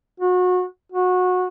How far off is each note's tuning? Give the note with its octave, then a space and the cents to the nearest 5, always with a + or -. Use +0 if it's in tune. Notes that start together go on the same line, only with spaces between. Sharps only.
F#4 -30
F#4 -20